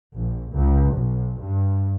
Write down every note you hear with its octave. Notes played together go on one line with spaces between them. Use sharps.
A#1
C#2
B1
G2